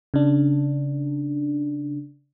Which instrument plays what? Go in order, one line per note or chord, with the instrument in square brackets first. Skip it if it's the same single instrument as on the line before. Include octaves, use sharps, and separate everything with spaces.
[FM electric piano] C#3 D4